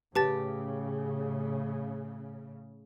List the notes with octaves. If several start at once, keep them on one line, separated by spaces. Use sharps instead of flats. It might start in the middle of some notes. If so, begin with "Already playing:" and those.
A2 C#3 G4 B4 A5 A6